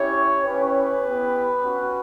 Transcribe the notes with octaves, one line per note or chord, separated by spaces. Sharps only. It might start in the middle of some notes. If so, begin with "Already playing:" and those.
Already playing: C#4 E4 G4 C#5
C#4 E4 G4 B4
B3 E4 G4
C#4 F#4